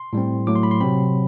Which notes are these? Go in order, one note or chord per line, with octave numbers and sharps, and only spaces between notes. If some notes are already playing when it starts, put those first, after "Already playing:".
Already playing: C6
A2 G3 C4
A2 F#3 A3 D6
C6
B5
C6
C3 F#3 C4 B5